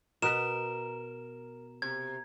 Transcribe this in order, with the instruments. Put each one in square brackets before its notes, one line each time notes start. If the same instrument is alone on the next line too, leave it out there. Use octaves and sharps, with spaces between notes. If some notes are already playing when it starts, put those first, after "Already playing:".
[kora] B2 B4 [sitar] A#4 [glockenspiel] E7
[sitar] C3 [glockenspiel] G#6